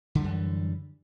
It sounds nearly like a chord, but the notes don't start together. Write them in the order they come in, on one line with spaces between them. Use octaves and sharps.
D3 G3 F#2 E3